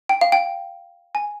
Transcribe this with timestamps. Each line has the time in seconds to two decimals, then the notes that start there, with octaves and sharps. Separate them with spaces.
0.09 G5
0.21 F5
0.32 G5
1.15 G#5